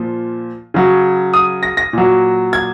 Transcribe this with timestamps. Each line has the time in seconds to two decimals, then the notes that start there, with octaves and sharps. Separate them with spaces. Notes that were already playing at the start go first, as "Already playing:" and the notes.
Already playing: A#2 F3
0.74 C#3 F#3
1.34 D#6
1.63 A#6
1.77 A#6
1.93 A#2 F#3
2.53 G#6